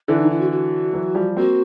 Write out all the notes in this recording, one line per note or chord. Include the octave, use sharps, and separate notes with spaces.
D3 E3 E4
D#4
E4
F#4
F#4
E3 F#3
F3 G3
A#3 C4 F#4